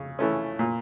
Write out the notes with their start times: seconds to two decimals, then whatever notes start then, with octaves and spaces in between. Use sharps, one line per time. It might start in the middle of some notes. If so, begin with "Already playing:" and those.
Already playing: C#3
0.19 E3 A3 C#4
0.59 A#2